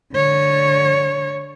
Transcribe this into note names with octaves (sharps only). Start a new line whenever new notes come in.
D3 C#5